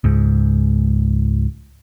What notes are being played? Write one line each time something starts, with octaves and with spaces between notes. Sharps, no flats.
C#2 G#2